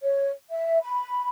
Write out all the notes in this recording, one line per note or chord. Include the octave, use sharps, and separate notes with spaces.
C#5
E5
B5